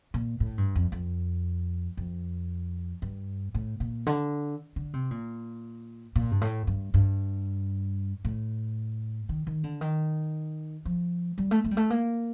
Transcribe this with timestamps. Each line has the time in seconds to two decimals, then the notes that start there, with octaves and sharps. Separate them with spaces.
0.14 A#2
0.40 A2
0.58 G2
0.75 F2
0.92 F2
1.97 F2
3.02 G2
3.55 A2
3.80 A#2
4.07 D3
4.76 D3
4.94 C3
5.11 A#2
6.16 A#2
6.31 G2
6.41 A2
6.67 G2
6.94 G2
8.25 A2
9.29 D#3
9.47 D#3
9.64 D3
9.81 D#3
10.85 F3
11.38 G3
11.51 A3
11.64 A3
11.71 G3
11.77 A3
11.90 A#3